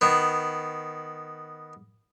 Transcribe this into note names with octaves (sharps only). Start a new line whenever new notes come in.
D#3 B3